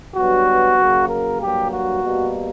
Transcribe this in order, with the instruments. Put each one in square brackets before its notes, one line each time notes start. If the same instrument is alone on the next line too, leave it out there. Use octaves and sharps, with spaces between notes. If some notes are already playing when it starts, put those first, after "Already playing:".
[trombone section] G2 F#3 B3 F#4
F#2 C#3 F#3 A#3
A#4
G2 F#3 A#3 G4
F#4
B2 G3 A#3